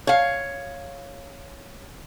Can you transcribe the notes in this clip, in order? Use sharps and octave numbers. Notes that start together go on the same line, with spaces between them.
C#5 F5